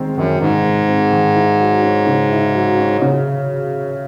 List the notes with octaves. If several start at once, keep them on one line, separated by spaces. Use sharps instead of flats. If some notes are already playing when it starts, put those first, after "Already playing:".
Already playing: D#3 G#3 C4
F#2 D#3
G#2 D#3
G#3
C4
D#3
E4
F#3
C#4
C#3
E4
F#3
C#4
C#3